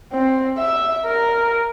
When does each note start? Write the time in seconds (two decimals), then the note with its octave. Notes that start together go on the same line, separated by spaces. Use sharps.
0.13 C4
0.58 E5
1.06 A#4